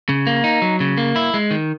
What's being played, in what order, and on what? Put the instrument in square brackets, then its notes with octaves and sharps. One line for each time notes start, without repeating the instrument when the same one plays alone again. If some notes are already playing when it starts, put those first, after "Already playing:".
[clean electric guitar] C#3
A#3
D#4
F#3
C#3
A#3
E4
G#3
D#3